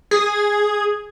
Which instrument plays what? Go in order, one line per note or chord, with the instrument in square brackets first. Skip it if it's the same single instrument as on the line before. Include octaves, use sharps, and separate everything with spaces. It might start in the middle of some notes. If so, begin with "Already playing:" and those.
[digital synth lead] G#4